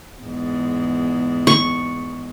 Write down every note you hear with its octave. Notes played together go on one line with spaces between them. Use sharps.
E2 G#2
C#6